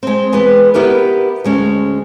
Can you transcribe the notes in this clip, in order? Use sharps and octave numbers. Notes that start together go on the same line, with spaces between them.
G#3 C4
E3 G#3 B3 G#4 B4
B3 E4 G4 A#4 B4
D2 G#3 C#4